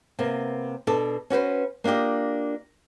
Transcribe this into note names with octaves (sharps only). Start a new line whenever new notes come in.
C3 A#3 B3
B2 D4 A4
C#4 F#4 B4 C5
A#3 D4 F4 G4 D#5